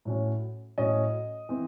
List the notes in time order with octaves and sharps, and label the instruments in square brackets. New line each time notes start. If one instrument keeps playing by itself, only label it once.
[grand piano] A2 F#3 C#4
A2 F#3 C#4 D#5
E3 C4